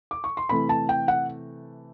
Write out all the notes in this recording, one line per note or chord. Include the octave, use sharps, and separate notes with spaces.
D6
C#6
C6
C3 E3 A3 B5
A5
G5
F#5